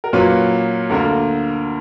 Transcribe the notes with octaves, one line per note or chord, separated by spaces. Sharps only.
A#4
A#2 F#3 A#3 C#4 B4
D2 D3 A#3 A#4